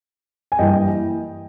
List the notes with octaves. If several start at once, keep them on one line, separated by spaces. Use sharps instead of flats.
G#5
G2 E3 G3 A#3 D#5 G5